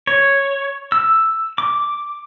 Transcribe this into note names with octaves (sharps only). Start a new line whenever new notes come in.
C#5
E6
D6